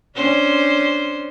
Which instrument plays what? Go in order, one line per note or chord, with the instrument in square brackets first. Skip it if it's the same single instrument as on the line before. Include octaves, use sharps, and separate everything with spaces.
[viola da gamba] C#4 D4 C5